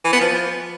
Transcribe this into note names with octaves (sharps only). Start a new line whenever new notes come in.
E3
B3
F3